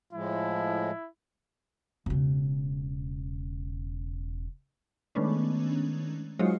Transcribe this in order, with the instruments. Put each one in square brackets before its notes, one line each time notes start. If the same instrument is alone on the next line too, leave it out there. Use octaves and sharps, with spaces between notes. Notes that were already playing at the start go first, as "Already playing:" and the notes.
[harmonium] A2 F3 G#3 [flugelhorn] E4
[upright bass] E1 C#3
[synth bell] D#3 G#3 A3 B3 C#4 D4
F#3 G#3 D#4 F4 C5 C#5